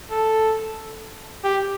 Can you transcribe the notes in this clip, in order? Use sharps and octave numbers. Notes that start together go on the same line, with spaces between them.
A4
G4